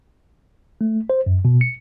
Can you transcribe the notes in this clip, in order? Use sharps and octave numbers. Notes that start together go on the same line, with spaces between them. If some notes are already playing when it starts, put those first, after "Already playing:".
A3
C5
F#2
B2
C#7